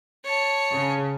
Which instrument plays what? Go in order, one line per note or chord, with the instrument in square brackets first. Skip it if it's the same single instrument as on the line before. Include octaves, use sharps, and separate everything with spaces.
[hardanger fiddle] C#5 A5
[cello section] C#3